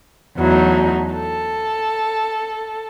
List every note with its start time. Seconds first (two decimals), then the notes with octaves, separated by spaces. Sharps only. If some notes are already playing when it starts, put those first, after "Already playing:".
0.38 E2 F#3 A3 D#4
1.13 A4